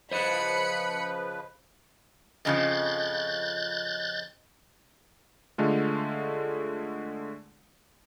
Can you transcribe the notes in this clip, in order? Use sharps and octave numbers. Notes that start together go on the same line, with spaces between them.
C#3 F3 B4 C5 D#5 B5 C#7
F2 C#3 F3 D#5 F#6 G6 A6
D3 G#3 A3 F4